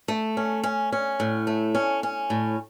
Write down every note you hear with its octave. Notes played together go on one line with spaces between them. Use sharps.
A3
C#4
C#4
C#4
A2
A3
C#4
C#4
A2